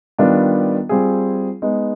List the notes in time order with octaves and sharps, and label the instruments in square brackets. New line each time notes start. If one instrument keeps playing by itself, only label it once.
[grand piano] D#3 G3 B3 D4 F4
G3 C4 F4 G#4
G#3 B3 D#4